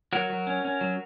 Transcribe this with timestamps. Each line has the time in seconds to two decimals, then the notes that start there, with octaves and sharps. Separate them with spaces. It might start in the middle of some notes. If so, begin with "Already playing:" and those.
0.13 F#3 F#4 A#4
0.30 F#3
0.47 C#4
0.65 C#4
0.81 F#3